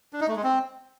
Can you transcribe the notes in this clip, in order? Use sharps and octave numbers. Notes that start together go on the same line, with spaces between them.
D4
D#4
A3
G#3
C4